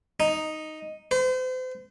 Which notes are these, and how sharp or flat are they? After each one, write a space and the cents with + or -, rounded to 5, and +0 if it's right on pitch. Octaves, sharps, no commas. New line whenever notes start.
D#4 +0
C5 -40